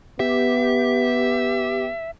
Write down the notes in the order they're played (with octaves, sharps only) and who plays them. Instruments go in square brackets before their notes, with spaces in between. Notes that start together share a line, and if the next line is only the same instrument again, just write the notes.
[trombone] B3 [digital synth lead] G4 [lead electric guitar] E5